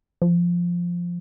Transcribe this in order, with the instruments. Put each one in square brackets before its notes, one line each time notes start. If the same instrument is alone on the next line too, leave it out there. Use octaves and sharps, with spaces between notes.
[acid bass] F3